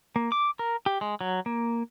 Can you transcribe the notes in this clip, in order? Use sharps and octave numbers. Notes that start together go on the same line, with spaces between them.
A#3
D6
A#4
G4
G#3
F#3
A#3